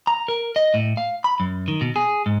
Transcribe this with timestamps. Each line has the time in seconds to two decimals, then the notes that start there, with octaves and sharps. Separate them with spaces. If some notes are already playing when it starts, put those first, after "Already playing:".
0.07 A#5
0.28 A#4
0.56 D#5
0.74 A2
0.97 F5
1.24 B5
1.40 F#2
1.68 D#3
1.81 B2
1.96 G#4
2.26 G#2